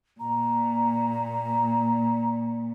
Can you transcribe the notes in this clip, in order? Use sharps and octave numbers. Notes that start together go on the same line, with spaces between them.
A#2 A#5